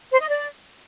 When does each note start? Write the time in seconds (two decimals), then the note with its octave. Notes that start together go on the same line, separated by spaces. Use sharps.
0.11 C5
0.20 D#5
0.29 D5